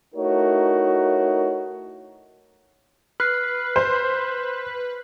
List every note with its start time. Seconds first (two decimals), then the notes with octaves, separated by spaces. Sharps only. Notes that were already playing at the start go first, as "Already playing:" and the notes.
0.15 A3 D#4 E4 F#4 A#4 C#5
3.20 B4 F6 F#6 C7
3.76 C5